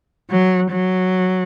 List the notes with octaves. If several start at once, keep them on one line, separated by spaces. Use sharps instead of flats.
F#3
F#3